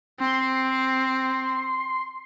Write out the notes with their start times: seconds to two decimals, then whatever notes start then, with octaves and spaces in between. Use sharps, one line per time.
0.20 C4 C6